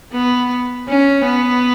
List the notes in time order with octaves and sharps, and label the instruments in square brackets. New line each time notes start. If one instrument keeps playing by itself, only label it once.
[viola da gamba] B3
C#4
B3